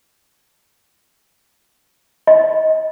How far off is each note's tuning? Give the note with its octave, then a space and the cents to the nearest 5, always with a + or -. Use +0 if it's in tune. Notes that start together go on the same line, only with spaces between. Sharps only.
D#5 +25